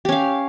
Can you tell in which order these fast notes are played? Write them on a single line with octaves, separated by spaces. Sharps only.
G4 C#4 F5